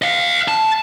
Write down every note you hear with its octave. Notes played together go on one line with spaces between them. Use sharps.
D#5 F5
A5